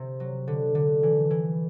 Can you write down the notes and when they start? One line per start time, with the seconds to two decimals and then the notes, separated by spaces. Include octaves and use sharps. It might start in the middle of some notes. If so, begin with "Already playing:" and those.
Already playing: C3
0.20 F#3
0.47 D3
0.75 D3
1.03 E3
1.30 E3